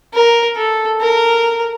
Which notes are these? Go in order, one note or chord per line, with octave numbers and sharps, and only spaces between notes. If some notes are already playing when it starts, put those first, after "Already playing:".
A#4
A4
A#4